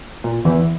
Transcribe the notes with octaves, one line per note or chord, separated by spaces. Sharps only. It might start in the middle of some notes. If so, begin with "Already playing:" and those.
A#2
E2 E3